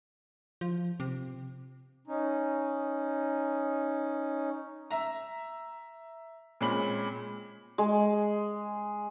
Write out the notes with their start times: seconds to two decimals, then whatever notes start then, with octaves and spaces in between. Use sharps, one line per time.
0.61 F3
1.00 C3
2.07 C#4 D#4
4.91 E5 A#5
6.61 A#2 G#3 C4 C#4 B5 F#7
7.78 G#3